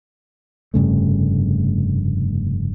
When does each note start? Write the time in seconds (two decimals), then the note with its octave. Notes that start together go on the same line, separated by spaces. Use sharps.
0.74 F1 G2 C#3 A3